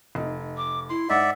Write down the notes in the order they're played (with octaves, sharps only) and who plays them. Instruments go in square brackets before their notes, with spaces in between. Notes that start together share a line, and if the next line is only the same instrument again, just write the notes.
[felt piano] F1 D#4
[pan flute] D6
[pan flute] E4 [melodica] C6
[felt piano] G#2 D#4 [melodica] D5 E5 [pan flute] F#5